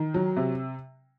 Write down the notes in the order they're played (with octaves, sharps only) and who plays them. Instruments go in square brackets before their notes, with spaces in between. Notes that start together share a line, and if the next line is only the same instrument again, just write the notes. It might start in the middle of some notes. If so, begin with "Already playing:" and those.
Already playing: [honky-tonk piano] D#3
F#3
C3